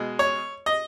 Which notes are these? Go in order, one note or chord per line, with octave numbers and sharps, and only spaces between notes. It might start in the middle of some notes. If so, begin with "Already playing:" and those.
Already playing: B2 G#3
C#5
D#5